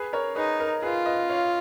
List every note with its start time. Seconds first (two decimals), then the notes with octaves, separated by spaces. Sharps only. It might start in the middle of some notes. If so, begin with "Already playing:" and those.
Already playing: G#4 B4
0.13 A#4 C#5
0.35 D#4 G#4 B4
0.60 A#4
0.82 F4 G#4 B4
1.06 B4 D#5
1.29 C#5 F5